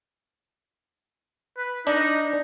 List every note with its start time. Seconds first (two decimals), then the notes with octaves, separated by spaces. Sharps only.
1.57 B4
1.87 D4 D#4